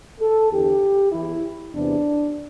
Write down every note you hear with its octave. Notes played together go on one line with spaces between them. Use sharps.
A4
E2 D3 G4
E2 E3 E4
E2 C3 E3 D4